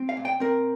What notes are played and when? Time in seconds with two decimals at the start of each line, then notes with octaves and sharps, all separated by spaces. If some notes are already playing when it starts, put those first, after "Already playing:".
Already playing: C4
0.09 F5
0.17 A#2
0.25 G5
0.40 C4 A#4